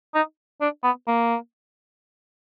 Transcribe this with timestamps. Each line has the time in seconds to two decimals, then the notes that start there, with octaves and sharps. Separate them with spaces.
0.14 D#4
0.61 D4
0.83 B3
1.08 A#3